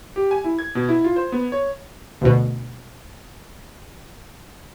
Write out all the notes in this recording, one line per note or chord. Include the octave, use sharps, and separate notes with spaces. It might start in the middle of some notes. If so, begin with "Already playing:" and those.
G4
G#5
E4
G#6
B2
E4
F4
C5
B3
C#5
D2 B2